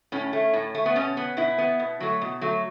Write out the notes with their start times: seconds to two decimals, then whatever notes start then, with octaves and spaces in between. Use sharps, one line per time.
0.12 A2 C#4
0.33 A3
0.53 A2
0.75 A3
0.86 B3
0.96 B2 C#4
1.17 B3
1.37 B2 E4
1.58 B3
1.80 B2
2.00 F#3 A3
2.21 B2
2.41 F#3 A3